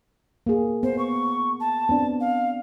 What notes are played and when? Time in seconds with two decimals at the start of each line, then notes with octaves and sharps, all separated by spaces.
0.46 A#3 G#4
0.83 B3 C5
0.98 C#6
1.60 A5
1.89 B3 C4 D4
2.20 F5